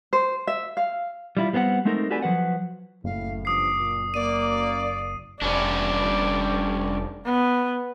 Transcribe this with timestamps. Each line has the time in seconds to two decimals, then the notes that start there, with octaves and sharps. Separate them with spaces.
0.13 C5
0.47 E5
0.77 F5
1.37 G3 E4 F4
1.53 G3 B3 C4 G4 F#5
1.85 G#3 A3 C4 D#4 A4 A#4
2.10 F#4 G4 A4 B4 D5 G#5
2.22 F3 F#3 B4 F#5
3.04 F#1 A2 F5
3.45 G2 F3 D6 D#6 C7
3.77 A#2
4.14 F#2 A#3 D5 D#7
5.42 F1 G3 C#4 D4 D5
7.25 B3